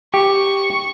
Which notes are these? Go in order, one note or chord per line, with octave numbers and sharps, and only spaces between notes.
G4 C#6